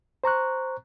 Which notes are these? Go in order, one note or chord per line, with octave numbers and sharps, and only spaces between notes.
C5 A#5 C#6 F#6